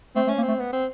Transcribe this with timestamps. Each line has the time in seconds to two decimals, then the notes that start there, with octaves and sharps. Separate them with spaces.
0.16 A3 C4
0.27 A3 C#4
0.38 A#3
0.42 C4
0.48 A3
0.59 B3
0.73 C4